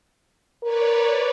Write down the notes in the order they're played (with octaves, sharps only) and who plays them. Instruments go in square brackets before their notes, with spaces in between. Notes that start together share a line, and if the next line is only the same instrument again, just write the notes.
[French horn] A#4 [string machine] B4 C#5 D5